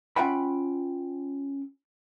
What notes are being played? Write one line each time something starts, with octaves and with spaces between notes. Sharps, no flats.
C#4 F4 E5 F#5 G5 B5